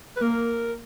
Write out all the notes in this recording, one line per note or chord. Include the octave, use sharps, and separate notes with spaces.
B4
A#3 A#4